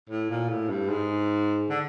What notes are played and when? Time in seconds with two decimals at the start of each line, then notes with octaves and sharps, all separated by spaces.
0.10 A2
0.30 A#2
0.49 A2
0.70 G2
0.89 G#2
1.70 D3